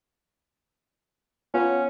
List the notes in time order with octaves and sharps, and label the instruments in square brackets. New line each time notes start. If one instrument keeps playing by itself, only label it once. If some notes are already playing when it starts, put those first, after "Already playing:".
[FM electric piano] B3 F4 F#5 [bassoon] C#4